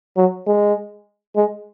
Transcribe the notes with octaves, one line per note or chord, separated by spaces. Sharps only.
F#3
G#3
G#3